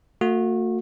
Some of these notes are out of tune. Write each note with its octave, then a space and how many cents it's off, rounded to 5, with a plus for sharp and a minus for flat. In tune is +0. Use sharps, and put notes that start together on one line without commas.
A3 +40 F#4 -30